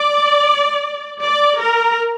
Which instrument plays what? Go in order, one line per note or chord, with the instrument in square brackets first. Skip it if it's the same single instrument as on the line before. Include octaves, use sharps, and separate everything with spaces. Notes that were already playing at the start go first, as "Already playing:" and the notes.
Already playing: [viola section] D5
D5
A#4